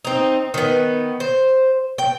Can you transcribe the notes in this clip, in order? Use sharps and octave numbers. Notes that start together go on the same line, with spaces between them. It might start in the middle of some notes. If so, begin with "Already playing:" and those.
C4 D#4
D#3 B3
C5
G5